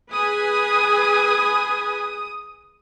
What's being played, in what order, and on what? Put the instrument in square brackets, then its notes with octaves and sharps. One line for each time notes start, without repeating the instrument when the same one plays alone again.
[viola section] G#4 B4 G#5 [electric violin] D#6